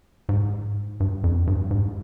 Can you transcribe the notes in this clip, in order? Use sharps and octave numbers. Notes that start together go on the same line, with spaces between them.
G#2
G2
F2
G2
G#2